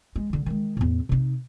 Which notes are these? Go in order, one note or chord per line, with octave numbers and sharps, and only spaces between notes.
G#3
D3 D#3
D#3 G#3
E2 A2
C3 D#4